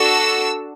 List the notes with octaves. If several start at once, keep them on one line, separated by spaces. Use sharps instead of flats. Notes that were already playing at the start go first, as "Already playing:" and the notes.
Already playing: D4 F#4 A4 E6